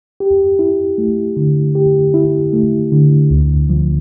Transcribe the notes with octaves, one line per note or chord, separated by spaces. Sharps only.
G4
E4
A3
D3
G4
E4
A3
D3
D2
F3